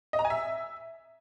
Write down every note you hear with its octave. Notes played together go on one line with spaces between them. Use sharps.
D#5
A#5
G#5
E5